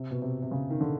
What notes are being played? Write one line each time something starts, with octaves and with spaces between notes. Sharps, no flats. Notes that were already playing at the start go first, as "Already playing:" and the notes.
Already playing: C3
B2
C3
C3
C#3
D#3
D3